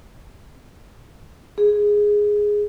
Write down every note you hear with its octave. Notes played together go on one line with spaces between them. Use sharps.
G#4